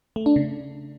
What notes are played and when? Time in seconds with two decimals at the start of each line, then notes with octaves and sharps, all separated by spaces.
0.16 A3
0.26 D4
0.36 C#3